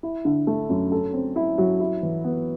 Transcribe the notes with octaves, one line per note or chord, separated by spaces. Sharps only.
E4
D3
A3
F#2
A4
C4
E4
F#3
E4
E3
B3